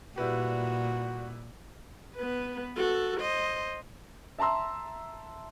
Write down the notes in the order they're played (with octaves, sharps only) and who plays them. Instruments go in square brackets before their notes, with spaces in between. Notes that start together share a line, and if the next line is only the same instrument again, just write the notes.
[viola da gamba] A#2 [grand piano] G3 E4 B4 [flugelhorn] F#4
[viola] B3 B4
F#4 A4
C5 D#5
[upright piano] E5 A5 A#5 C6 E6